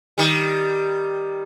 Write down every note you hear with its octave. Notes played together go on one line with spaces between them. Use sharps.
D#3 G3